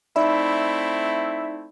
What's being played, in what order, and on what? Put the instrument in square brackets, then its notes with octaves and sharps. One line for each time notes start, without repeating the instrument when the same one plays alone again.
[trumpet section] A3 C4 E4 [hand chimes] D#4 D5 B5 [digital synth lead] E5